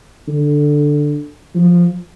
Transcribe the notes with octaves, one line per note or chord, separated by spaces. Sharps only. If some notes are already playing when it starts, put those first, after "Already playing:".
D3
F3